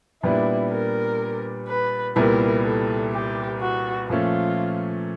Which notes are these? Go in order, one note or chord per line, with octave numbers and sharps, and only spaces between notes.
A#2 G3 B3 D4 E4
A#4
B4
C2 A#2 G3 B3 E4 A#4
A4
G4
F#4
A#2 F3 A3 C#4 F4